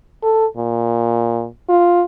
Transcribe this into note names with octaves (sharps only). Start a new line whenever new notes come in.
A4
A#2
F4